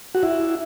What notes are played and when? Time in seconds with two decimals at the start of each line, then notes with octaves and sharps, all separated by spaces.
0.15 F#4
0.23 E4